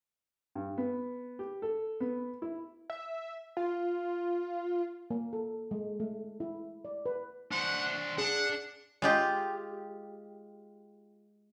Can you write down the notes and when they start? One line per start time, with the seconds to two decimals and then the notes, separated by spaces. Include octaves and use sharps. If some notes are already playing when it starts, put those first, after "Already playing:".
0.55 G2
0.78 B3
1.39 G4
1.62 A4
2.00 B3
2.42 E4
2.90 E5
3.57 F4
5.10 A#3
5.33 A4
5.71 G#3
6.00 A3
6.40 E4
6.85 D5
7.06 B4
7.51 D4 C5 F#5
8.18 D4 G#4 F#5
9.02 G#3 F4 G4